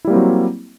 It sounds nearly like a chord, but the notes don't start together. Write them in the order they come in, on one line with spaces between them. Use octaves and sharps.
E4 G3 A#3 C4 F#3